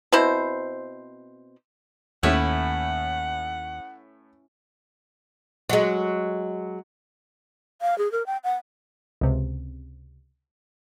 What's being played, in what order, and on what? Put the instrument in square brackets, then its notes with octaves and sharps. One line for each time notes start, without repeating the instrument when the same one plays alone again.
[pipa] B2 C4 E4 C5
[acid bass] D#2 [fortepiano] A2 A3 [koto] C#4 E4 B4 [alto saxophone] F#5
[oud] F#3 G#3
[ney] F5
G#4
A#4
G5
F#5
[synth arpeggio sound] C#2 C3